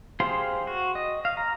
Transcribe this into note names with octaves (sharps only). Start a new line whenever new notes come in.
G4 G#4 C5 F5 C6
F#4
D#5
F5
A#5